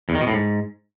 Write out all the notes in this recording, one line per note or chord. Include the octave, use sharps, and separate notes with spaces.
E2
D#3
B2
A2
G#2